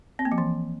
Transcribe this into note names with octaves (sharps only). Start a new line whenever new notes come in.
C4
A#3
F3
E3